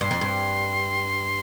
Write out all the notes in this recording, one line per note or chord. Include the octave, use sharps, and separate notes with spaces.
G2 C6
F2
G2